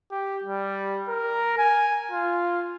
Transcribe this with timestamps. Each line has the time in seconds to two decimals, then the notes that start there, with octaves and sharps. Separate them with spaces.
0.11 G4
0.44 G3
1.09 A#4
1.58 G#5
2.11 F4